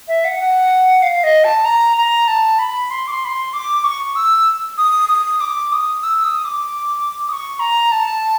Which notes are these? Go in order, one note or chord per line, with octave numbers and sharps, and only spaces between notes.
E5
F#5
F#5
F5
D#5
A5
A#5
A#5
A5
B5
C6
D6
C6
B5
C6
D6
C#6
E6
D#6
D#6
D6
D#6
E6
D#6
D6
D#6
C#6
A#5
A5